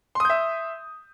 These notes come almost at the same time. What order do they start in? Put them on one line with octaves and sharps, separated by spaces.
C6 D#6 G6 E5